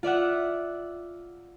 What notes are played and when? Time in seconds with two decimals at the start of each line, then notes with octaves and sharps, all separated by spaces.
0.03 F4 D5 E5 F#5